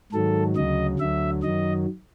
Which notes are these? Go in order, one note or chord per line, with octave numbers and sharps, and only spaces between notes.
G#2 D#3 F#3 A4
D2 C#3 F#3 D#5
D2 D3 F#3 E5
F#2 D#3 F#3 D#5